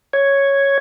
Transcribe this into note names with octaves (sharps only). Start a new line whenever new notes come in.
C#5 G#6